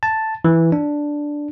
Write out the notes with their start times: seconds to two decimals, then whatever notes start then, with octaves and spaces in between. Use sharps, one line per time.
0.03 A5
0.45 E3
0.72 D4